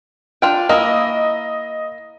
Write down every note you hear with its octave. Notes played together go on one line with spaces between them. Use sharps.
D4 F4 G5
A#3 E4 D#5